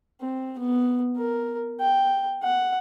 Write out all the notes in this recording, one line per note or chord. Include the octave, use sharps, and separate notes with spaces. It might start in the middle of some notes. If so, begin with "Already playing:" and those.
C4
B3
A#4
G5
F#5